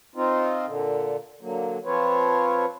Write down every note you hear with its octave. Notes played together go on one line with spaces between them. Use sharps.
C4 D#4 F4
A#2 D3
D3 F#3 A#3
F3 C4 F4 B4 C#5